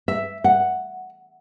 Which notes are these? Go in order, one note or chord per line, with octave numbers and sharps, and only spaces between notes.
E5
F#5